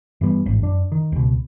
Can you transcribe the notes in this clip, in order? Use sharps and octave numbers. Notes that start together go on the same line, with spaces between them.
G2 E3 G3 B3
A1 G#2
F#2 D4
D#3
C#2 B2